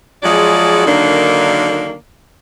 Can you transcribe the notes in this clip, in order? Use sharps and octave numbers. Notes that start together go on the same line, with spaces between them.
F3 F#3 G#3 F#4 G#4 D5
D3 D#3 F#3 A#3 D4 D#4